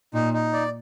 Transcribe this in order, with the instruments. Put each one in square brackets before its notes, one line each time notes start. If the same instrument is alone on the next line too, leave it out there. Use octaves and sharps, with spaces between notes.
[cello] A#2 [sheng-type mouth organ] D#4
[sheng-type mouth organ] D#4
D5